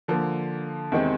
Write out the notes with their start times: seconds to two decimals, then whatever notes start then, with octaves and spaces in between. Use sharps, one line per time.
0.08 D3 F3 A#3
0.92 E2 C3 D#3 G#3 C4